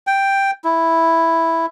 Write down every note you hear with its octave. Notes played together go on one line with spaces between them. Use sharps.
G5
E4